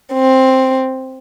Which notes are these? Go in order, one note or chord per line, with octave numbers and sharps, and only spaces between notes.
C4